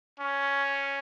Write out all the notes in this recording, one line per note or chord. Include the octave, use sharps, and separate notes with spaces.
C#4